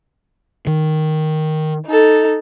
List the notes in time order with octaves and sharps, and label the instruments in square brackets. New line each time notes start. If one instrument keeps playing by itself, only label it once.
[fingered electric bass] D#3
[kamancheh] D#4 A4